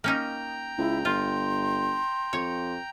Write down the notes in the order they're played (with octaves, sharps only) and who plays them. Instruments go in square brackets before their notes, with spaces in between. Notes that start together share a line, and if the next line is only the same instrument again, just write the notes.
[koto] A#3 C#4 D#4 [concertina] G5 A#5
[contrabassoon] C#2 [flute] E4
[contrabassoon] G1 [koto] F4 [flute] C6
[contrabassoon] F2 [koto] C#5